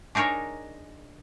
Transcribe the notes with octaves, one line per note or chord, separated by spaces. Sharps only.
D4 D#4 G#4 A#4 C#5